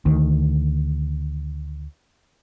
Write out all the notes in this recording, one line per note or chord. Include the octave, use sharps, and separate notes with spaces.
D2 D#3